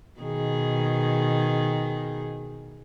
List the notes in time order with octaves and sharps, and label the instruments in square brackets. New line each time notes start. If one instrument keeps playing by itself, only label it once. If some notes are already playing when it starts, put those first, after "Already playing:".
[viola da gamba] B2 D#3 G#4